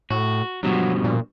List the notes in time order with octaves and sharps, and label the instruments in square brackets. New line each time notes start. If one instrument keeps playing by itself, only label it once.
[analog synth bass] A2 [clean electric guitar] F#4
[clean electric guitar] G2 B2 F3 [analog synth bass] F#3
[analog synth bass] A#2